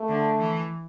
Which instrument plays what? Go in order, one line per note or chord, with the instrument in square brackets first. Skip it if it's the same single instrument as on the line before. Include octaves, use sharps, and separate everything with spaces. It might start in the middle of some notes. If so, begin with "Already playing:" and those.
Already playing: [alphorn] A3
[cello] D3
E3